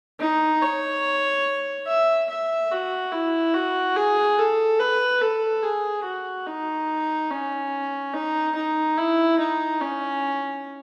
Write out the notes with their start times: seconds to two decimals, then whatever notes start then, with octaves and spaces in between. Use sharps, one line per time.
0.20 D#4
0.62 C#5
1.87 E5
2.29 E5
2.71 F#4
3.12 E4
3.54 F#4
3.96 G#4
4.38 A4
4.79 B4
5.21 A4
5.63 G#4
6.04 F#4
6.47 D#4
7.30 C#4
8.13 D#4
8.55 D#4
8.98 E4
9.39 D#4
9.81 C#4